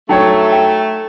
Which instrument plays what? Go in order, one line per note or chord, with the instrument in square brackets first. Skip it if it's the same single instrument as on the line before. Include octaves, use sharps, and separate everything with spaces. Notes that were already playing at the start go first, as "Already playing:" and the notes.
[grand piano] F#3 C#5 [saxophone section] A3 [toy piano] D#4 G5
[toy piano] G5